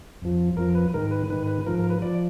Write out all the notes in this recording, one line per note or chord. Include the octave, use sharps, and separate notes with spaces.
F2 F3
F2 F3 A#4
B4
G#2 D#3 A#4
B4
G#2 D#3 B4
B4
G#2 F3 A#4
A#4
B4
F3 D5